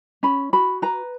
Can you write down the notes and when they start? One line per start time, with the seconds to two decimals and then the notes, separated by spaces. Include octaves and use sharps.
0.23 C#4 B5
0.53 F#4 B5
0.82 B4 A#5